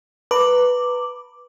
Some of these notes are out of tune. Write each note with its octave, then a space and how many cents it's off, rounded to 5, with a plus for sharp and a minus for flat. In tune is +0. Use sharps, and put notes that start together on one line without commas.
B4 +0 A#5 -30 D6 +0